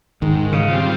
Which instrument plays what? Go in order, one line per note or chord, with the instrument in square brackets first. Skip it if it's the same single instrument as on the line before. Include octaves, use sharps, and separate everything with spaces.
[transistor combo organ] G#2 [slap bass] D#3
[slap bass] C#3
[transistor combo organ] G3 C4 F4